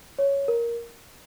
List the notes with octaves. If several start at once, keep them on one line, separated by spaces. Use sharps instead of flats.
C#5
A#4